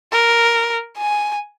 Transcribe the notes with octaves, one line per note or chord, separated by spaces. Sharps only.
A#4
G#5